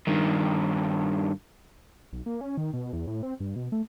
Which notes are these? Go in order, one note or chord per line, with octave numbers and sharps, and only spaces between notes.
G2 D#3
B1
A#3
C#4
D#3
B2
E2
A2
C4
G2
B2
A3